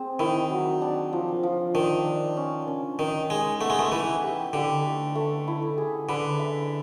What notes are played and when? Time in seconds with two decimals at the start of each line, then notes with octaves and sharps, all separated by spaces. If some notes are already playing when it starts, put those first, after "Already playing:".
Already playing: C4 G#4
0.19 D#3 E4
0.50 F#3
0.82 D4
1.13 F3
1.43 F3
1.74 D#3 D4
2.06 D4
2.37 C#4
2.67 C#4
2.99 D#3 D#4
3.30 G#3 D#4
3.60 A3 B3
3.70 G#3
3.79 A3
3.92 E3 E4
4.23 G4
4.53 D3 G4
4.85 A3
5.15 A3
5.47 E4
5.78 G#4
6.09 D3 B4
6.39 E5